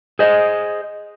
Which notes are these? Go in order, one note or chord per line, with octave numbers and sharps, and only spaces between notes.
G#4 C5 D#5